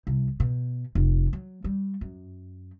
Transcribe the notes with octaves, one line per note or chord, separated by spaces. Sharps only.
C2
B2
F1
F#3
G3
F#2